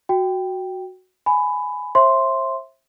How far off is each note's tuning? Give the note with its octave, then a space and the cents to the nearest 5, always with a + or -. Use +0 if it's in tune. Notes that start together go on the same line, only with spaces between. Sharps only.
F#4 +0 G5 +0
G#5 +10 B5 +15
C5 +40 E5 +5 C6 +0